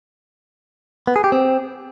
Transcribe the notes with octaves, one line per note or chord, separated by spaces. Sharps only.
B3
G#4
G4
C4